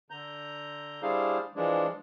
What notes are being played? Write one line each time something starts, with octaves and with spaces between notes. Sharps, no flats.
D3 A#5 G6
G3 D4 E4 G#4 C5 F5
E3 F3 G#3 D4